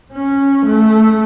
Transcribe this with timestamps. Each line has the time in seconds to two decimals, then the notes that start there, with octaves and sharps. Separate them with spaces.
0.13 C#4
0.66 A3